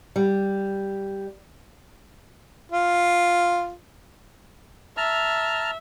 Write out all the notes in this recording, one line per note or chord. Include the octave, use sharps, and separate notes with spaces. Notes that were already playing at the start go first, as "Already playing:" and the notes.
G3
F4
E5 A5 A#5 F6